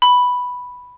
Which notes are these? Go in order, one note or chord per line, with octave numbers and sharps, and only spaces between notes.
B5